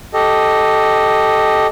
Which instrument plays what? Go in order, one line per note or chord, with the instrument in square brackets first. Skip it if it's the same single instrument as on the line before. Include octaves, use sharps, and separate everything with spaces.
[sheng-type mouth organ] G4 A4 D#5